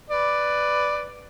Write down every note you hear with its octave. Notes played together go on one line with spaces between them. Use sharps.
B4 D5